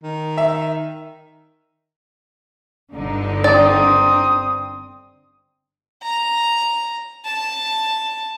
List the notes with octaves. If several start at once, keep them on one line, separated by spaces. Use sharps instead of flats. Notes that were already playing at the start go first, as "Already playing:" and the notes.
D#3
E5
G1 D3 D#4
C4 D5 D#6
A#5
A5